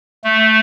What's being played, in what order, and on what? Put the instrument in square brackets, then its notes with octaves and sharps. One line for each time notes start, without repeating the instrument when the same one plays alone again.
[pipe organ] A3